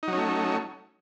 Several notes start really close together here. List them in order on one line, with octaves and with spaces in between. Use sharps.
D#4 F#3 C#4 A3